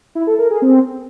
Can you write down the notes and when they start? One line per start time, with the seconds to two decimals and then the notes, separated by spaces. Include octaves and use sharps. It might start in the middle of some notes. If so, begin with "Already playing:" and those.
0.15 E4
0.27 A4
0.39 A#4
0.50 G#4
0.62 C4